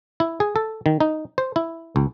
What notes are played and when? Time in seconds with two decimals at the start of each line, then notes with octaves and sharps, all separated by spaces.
0.20 E4
0.40 G#4
0.56 A4
0.86 D#3
1.00 D#4
1.38 C5
1.56 E4
1.96 C#2